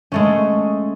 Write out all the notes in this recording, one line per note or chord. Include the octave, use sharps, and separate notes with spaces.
G#3 A3 C#4